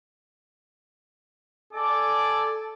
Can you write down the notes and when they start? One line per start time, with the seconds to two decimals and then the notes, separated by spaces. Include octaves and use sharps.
1.73 A4 D5 G#5 D6